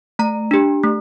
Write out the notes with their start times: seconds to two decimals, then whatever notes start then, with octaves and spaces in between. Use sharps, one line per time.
0.19 A3 A#5
0.51 D4 G4
0.83 A3